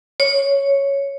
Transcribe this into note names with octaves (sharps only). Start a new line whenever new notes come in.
C#5